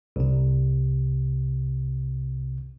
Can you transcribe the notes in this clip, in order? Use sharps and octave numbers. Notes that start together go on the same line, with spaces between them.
C2 C3